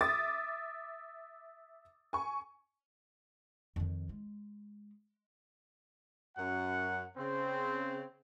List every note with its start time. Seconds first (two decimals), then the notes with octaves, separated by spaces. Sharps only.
0.01 E5 D6 D#6 A6
2.13 G#5 C#6
3.76 F2 D#3
4.09 G#3
6.35 F#2 F#5
7.17 C#3 C4